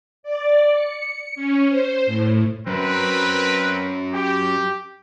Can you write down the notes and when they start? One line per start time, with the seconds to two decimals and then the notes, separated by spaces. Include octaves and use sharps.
0.23 D5
0.74 C#7
1.35 C#4
1.69 C5
2.07 A2
2.67 F#2 C4 A#4 B4
4.13 G4